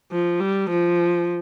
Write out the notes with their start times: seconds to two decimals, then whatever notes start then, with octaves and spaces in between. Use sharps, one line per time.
0.12 F3
0.40 G3
0.70 F3